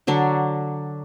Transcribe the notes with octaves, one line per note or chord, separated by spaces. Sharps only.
D3 F#3 D4